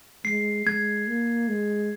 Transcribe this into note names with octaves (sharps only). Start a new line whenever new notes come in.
G#3 C7
G#3 G#6
A#3
G#3